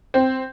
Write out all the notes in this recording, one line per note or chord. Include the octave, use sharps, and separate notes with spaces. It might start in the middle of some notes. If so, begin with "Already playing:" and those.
C4